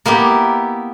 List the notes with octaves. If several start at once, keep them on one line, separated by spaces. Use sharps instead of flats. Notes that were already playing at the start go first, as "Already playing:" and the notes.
A#3 B3 E4 G4